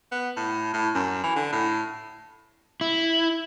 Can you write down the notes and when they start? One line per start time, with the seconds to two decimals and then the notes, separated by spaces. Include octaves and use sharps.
0.12 B3
0.37 A2
0.74 A2
0.95 F#2
1.24 E3
1.36 D3
1.52 A2
2.81 E4